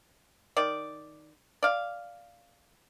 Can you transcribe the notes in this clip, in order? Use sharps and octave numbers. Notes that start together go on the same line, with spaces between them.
D#3 D5
D5 F5